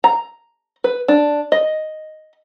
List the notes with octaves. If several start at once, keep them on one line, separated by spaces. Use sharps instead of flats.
A#5
B4
D4
D#5